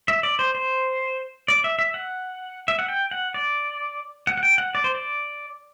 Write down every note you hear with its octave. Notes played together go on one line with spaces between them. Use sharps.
E5
D5
C5
C5
D5
E5
E5
F#5
E5
F#5
G5
F#5
D5
F#5
F#5
G5
F#5
D5
C5
D5